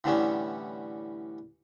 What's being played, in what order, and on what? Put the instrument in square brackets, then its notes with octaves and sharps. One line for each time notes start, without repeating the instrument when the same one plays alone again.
[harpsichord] A2 D3 E3 G3 B3 C#4